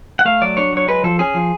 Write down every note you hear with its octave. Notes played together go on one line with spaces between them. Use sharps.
F#5
A3 F5
F#3 D5
D4 C#5
F#3 C#5
G#3 B4
F3 A4
C#4 G#4
F3